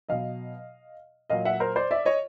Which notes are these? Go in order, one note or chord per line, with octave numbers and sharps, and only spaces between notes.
B2 F#3 D#5 F5
A#2 F#3 D#5 F5
E5 F#5
A#4 C5
C5 D5
D5 E5
C#5 D#5